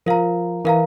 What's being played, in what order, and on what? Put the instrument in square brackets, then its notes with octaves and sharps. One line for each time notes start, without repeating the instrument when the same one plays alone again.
[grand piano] F3 [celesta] A#4 F5 A#5
[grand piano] E3 [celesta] A#4 F5 A#5